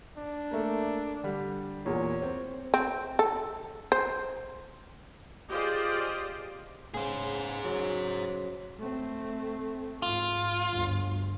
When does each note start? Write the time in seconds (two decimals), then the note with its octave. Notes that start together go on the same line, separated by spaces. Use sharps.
0.17 D4
0.51 A3 A#3
1.24 D3 G3
1.86 E2 A#2 C#5
2.22 C4
2.74 C4
3.19 A4
3.92 C5
5.51 F4 G4 G#4 C5 D5 D#5
6.94 C#3 B3 G#4 C5
7.64 C#3 F#3
8.79 A3 C4
10.02 G#2 F4
10.73 G1 D2